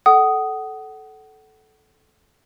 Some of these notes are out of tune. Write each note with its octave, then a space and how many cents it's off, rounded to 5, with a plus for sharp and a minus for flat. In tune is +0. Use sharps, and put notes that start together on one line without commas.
A4 -15 F#5 +30 D#6 +0